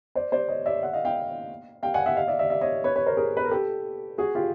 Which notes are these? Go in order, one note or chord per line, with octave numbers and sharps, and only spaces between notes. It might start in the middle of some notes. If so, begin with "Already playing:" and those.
C5 D5
C5 D5
C#5 D#5
D5 E5
E5 F#5
D#5 F5
F5 G5
F5 G5
F#5 G#5
E5 F#5
D#5 F5
D5 E5
D5 E5
D5 E5
C#5 D#5
B4 C#5
B4 C#5
A#4 C5
G#4 A#4
B4
A#4
G4 A4
F#4 G#4
F4 G4